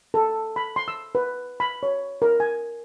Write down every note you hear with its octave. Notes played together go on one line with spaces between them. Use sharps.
A4
B5
C6
E6
B4
B5
C#5
A#4
G#5